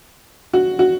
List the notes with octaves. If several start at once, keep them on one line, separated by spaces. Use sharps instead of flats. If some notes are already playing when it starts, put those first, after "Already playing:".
F#4
F#4